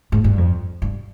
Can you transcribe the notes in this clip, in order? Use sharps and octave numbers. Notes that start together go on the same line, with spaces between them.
G#2
G2
F2
G2